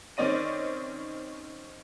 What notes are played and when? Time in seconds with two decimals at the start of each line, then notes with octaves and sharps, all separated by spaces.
0.17 D#3 C4 C#4 D5 D#5 D#7